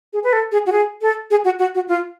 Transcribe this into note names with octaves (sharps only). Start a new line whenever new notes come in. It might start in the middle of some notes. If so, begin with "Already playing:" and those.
G#4
B4
A4
G#4
F#4
G#4
A4
G#4
F#4
F#4
F#4
F4